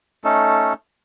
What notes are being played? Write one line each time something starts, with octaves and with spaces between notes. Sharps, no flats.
A3 C#4 D#4 A4